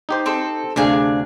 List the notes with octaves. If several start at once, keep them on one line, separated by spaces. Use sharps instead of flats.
D#4 G4 C5
C4 A4
D2 C3 D4 G#4 F5